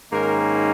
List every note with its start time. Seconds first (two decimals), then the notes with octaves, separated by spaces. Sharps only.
0.12 G#2 D#3 A#3 C#4 A#4